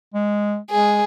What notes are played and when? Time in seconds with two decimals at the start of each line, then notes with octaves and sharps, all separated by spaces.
0.14 G#3
0.71 G#3 G#4